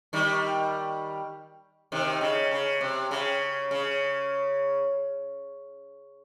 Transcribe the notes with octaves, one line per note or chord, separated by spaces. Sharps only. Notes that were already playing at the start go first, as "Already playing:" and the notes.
D#3 G3
C3 D#3
C#3
C#3
C3
C#3
C#3